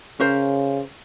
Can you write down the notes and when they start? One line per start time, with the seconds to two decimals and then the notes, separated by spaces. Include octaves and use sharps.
0.20 C#3 C#4 A#4 C5